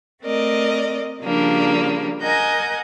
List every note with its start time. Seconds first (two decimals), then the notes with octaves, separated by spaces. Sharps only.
0.22 A3 C4 A#4 D5 D#5
1.22 C#3 F3 G3 A#3 D4
2.21 A#4 D#5 F#5 G#5 G6